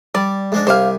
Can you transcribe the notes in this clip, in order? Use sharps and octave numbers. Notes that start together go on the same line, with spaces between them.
G3 D5
G#2 G#3 D4
C2 G4 C5 F5 G#5